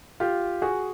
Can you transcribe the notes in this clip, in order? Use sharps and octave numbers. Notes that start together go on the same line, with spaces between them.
F4 G4
F#4 G#4